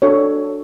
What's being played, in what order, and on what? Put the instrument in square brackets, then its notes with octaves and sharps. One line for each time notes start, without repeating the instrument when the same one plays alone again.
[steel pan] D4 F#4 A4 C#5